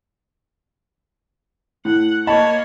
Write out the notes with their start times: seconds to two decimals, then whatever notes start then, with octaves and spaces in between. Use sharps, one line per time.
1.85 A2 F#5
2.27 A#3 C#5 D#5 A5 B5